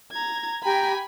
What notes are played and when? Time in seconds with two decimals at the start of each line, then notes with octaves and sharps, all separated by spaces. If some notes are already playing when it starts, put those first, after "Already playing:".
0.12 A#5 G#6
0.64 G4 G5 G#5 A#5 B5